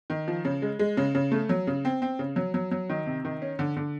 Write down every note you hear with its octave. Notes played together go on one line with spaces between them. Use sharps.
D#3
F3
C#3
G#3
G#3
C#3
C#3
A3
F#3
C#3
C4
C4
C#3
F#3
F#3
F#3
D#3
C3
D#3
C#4
D3
D3